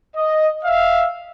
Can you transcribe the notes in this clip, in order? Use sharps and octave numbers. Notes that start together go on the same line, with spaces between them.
D#5
E5 F5